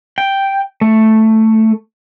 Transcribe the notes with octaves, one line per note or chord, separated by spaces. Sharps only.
G5
A3